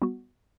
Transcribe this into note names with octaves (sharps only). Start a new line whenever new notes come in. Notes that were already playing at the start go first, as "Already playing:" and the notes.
G3 B3 F#4